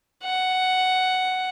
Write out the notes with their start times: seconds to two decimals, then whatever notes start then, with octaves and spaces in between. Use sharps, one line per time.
0.23 F#5